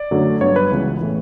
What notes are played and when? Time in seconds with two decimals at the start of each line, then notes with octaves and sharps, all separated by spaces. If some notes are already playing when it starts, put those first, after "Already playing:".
Already playing: D5
0.11 F#2 D3 F#3 A3
0.41 G2 F#3 B3 C#5
0.56 B4
0.71 C#2 C#3 E3 B3
1.01 A2 E3